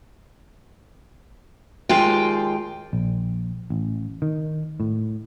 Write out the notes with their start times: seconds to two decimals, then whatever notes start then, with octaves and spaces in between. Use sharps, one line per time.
1.89 D#2 G#3 F4 G5
2.93 A#1
3.70 A1
4.22 D#3
4.80 A2